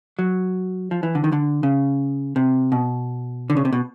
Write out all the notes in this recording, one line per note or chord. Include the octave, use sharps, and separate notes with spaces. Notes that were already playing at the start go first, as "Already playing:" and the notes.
F#3
F3
E3
D3
D#3
D3
C#3
C3
B2
D3
C#3
C3
B2